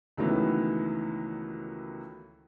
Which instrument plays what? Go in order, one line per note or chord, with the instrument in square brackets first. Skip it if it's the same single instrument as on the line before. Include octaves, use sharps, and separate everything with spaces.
[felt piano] C#2 D#3 E3 F#3 A3 B3